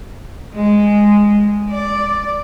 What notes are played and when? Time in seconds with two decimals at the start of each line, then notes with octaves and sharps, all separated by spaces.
0.55 G#3
1.72 D5